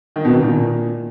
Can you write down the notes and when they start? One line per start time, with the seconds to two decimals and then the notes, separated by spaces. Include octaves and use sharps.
0.16 D#3
0.25 B2
0.34 D#3
0.43 A#2